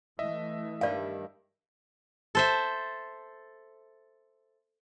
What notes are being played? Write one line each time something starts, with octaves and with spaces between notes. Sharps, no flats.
E3 A3 D#5 E5
G2 D#3 D5 F5
A4 C5 E5